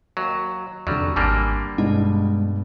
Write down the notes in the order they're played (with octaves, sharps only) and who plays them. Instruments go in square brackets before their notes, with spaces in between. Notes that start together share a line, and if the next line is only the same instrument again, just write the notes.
[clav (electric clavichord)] D#2 F#3
[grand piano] F1 D3 D5 [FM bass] E2 [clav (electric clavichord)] F#3 G3
[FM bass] G#1 [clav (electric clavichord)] D3 G3 A#3 [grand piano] G#5 D7
[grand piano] G2 B2 [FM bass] G#3